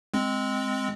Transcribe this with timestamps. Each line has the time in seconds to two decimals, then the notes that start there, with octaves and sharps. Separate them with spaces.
0.14 G#3 C4